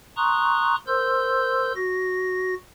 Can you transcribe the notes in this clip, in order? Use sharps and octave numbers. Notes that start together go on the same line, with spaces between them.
A#5 C6 C#6 D#6 F#6
A#4 C5 C6 E6 G6
F#4 A#6